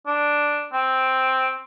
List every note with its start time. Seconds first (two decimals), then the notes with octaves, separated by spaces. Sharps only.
0.07 D4
0.73 C4